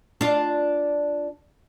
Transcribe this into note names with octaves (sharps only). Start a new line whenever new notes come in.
D4 F4